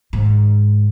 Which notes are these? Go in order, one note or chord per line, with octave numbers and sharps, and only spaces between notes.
G#2 D#3